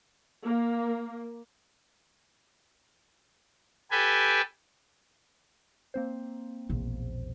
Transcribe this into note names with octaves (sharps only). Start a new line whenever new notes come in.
A#3
G4 A4 B4 G5 G#5
A#3 C4 C5
E1 A#1